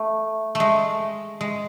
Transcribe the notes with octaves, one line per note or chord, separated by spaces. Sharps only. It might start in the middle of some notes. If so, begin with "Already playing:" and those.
Already playing: A3
A3
G#3
G#3